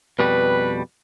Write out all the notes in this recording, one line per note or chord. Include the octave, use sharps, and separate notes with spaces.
F2 B2 G3 B4